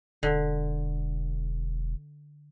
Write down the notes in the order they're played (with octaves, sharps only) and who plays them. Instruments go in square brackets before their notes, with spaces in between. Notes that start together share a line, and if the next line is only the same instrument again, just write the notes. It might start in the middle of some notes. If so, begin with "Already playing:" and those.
[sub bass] E1 [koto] D3